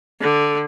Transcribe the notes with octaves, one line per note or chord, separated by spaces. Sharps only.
D3